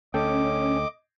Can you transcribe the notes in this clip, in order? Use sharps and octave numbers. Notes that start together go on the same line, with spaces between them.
D2 C#4 A4 D#5 G5 D6